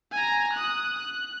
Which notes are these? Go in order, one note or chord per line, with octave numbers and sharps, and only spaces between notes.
G#5 A#5
D#6 F#6
F#6